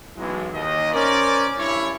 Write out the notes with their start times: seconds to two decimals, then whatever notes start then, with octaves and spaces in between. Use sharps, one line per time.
0.17 B1 E3 F#3 G#3
0.53 D#2 D#3 D#5
0.93 C#4 A#4 C5 D5
1.58 G2 C#4 E4 C#5